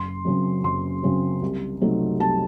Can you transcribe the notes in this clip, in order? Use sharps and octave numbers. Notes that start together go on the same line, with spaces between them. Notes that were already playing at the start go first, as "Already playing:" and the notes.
Already playing: F#1 C6
F#2 C#3 F#3 C4
F#1 C6
F#2 C#3 F#3 C4
C2
C3 F#3 A3 D#4
C2 A5